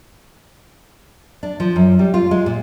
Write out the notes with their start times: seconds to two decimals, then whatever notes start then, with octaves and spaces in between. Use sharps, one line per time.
1.43 D4
1.60 F3
1.76 F#2
1.99 G3
2.14 F4
2.31 G#3
2.46 A#2